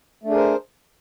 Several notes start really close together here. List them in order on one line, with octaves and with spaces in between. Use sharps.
A3 D4 G#4 A#4 C5